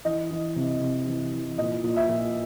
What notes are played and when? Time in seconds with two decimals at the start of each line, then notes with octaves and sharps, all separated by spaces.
0.05 E3 D#5
0.31 E3
0.56 C3
0.81 C3
1.07 E3
1.32 E3
1.58 A#2 D#5
1.84 A#2
1.96 E5
2.09 A#2